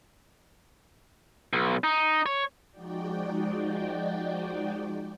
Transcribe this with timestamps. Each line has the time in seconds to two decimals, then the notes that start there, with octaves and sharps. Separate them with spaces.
1.53 B1
1.84 D#4
2.26 C#5
2.71 F3 G#3 D#4 F#4 D5 G5